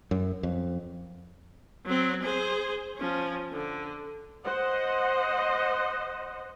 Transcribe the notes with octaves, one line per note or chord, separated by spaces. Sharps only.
F#2
F2
F#3 C4
G#4 C5
F3 C#4
D3
C5 D#5 F#5